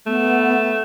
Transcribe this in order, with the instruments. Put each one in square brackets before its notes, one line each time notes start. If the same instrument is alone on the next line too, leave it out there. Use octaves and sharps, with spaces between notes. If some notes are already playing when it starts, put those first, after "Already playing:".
[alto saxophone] A3 [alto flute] B3